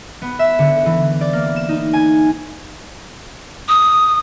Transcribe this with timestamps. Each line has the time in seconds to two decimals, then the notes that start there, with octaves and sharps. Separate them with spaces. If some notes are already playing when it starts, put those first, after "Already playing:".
0.22 B3
0.39 E5
0.59 D3
0.86 E3
1.21 D5
1.33 A#3
1.56 E7
1.69 D#4
1.93 G#5
3.69 D#6